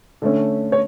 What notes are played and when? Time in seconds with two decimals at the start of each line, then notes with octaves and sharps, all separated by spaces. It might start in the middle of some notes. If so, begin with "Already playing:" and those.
0.22 D3 A3 C#4
0.72 C#5